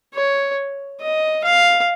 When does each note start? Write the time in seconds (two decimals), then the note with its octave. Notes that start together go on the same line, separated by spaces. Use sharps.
0.15 C#5
1.01 D#5
1.44 F5